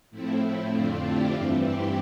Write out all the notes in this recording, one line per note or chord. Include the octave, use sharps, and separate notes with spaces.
A2 F3 A3 C4 E4
E4
F2 D3 A3 C4 D4 F4
E4 G4
G2 E3 G3 C4
E4 G4